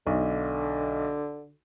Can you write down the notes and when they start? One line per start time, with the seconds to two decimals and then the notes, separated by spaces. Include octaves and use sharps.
0.07 B1 D3